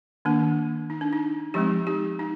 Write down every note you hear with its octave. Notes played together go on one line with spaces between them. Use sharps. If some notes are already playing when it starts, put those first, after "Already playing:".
D#3 A#3 D4
D#4
D4
D#4
F3 G#3 C4 D#4 G4
D#4 G4
D#4